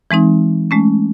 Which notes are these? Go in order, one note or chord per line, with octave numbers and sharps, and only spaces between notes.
E3 G#3 C4 D#4
G#3 A3 C#4